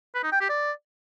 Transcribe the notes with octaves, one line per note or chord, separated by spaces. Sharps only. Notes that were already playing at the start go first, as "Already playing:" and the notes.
B4
D#4
G5
G4
D5